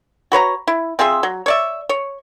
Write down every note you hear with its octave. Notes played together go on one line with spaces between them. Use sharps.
F#4 B4 C#5 A#5
E4
C4 F4 G#4 E5
F#3
C#5 D5 E5
C#5